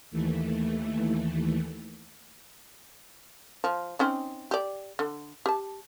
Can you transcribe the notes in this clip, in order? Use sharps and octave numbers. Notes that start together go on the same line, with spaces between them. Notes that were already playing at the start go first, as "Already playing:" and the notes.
D#2 E3 A3
F3
C4 C#4 D#4
G4 D5
D3
G4 A5